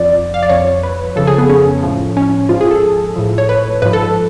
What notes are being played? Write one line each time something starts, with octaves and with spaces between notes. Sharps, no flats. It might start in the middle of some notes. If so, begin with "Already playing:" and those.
Already playing: F2 F3 D5
F5
D5
F2 F3 C#5
B4
F2 C#3 F3 A4
G#4
B3
C#4
A2 F3
C#4
G#2 F3 F4
G#4
A4
A2 F3
C#5
B4
G#2 F3 B4
A4